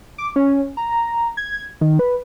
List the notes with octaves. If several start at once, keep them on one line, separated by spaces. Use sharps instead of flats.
D6
C#4
A#5
G#6
D#3
B4